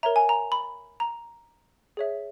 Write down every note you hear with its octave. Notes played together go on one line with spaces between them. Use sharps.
A#4 C#5 E5 A#5
G#5
A#5
B5
A#5
G#4 C#5 E5